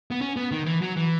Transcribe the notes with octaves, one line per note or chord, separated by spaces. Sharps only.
B3
C#4
B3
D#3
E3
F#3
E3